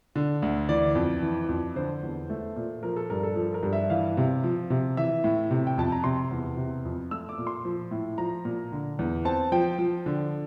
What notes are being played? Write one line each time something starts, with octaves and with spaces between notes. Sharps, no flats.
D3
D2
E3 D5
F2
E3
F2
D3 C5
E2
A3
A#2
F3 A#4
A4
G2 A#4
A4
F3 A4
A#4
G2
E5
E3 F5
C3
F3
C3
E3 E5
A2
C3
G5
F2 A5
A#5
C3 C6
E2
C3
F2
A3 E6
D6
A#2
C6
F3
A2
F3 A#5
A#2
D3
E2
C4 A5
F3 G5
F3
D3